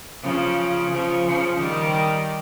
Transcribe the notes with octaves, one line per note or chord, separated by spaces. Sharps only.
C#3 F3
C#3 F3
C#3 F3
D#3 G3